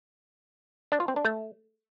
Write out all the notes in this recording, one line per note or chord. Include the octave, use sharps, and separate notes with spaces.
D4
F4
C4
D4
A3